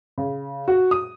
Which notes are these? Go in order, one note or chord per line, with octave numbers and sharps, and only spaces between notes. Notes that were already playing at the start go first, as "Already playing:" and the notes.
C#3
F#4
D#6